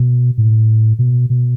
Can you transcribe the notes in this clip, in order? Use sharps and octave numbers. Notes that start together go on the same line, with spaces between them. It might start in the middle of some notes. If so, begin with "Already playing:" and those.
Already playing: B2
A2
B2
B2